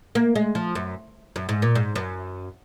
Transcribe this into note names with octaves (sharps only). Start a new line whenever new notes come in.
A#3
G#3
F3
F#2
F#2
G#2
A#2
G#2
F#2